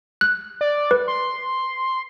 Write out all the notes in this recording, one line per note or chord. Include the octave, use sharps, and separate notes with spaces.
F#6
D5
B4
C6